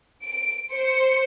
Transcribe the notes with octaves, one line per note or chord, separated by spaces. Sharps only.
D7
C5 C#7